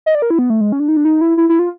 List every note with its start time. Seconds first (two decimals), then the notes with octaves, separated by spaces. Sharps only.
0.06 D#5
0.15 D5
0.22 A#4
0.30 E4
0.39 B3
0.50 A3
0.61 G#3
0.72 C#4
0.80 D4
0.88 D#4
0.97 D4
1.05 D#4
1.21 E4
1.37 E4
1.49 E4
1.59 F4